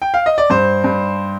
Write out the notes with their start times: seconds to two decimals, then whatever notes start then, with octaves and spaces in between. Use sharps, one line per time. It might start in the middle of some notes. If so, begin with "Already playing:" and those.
0.02 G5
0.14 F5
0.26 D#5
0.38 D5
0.50 G2 C5
0.84 G2